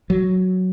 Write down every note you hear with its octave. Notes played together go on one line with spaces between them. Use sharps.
F#3